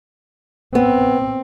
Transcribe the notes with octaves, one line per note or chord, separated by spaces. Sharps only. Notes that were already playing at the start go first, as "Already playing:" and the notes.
B3 C4